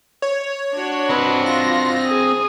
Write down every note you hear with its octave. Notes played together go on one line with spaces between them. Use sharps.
C#5
D4 F#4
C4 B4 D#5
F4 A#6
G#4 D#6